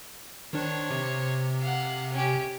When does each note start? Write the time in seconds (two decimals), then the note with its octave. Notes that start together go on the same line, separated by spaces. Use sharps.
0.53 D#3 D4 C5 C#5
0.90 C3
1.61 F5 F#5
2.12 C#4 G4